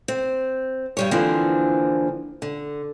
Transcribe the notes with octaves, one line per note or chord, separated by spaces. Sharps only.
C4
G2 G3 C#5
D3 E3 F3 A#3 C4 D4
D3